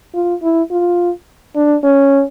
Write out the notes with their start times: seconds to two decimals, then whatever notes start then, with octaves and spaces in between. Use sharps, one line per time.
0.15 F4
0.43 E4
0.71 F4
1.56 D4
1.84 C#4